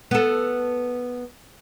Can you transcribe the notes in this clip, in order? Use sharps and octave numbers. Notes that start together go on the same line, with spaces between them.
B3 A4